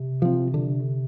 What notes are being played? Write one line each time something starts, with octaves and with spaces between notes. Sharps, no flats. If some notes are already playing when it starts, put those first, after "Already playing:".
Already playing: C3
F3 C4
D3